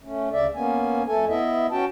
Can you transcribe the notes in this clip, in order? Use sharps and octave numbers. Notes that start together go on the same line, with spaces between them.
A3 C#4
D2 C#3 D5 E5
A#3 B3 C#4 G#5
F2 A3 A4 G#5
B3 E4 D#5 E5
C#4 F#4 G5 A5